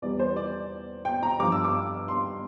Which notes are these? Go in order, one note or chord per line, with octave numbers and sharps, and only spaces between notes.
E2 E3 G3 D5
C5
D5
G5
A#5
G2 F3 D6
E6
D6
C6